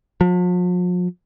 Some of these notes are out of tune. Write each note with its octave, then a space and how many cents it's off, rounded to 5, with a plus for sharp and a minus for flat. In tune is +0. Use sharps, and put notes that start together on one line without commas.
F3 +45